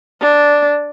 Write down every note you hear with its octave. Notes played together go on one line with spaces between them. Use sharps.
D4